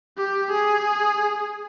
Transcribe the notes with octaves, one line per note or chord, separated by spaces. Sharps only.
G4
G#4